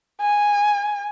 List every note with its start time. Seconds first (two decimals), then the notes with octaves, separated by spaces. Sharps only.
0.21 G#5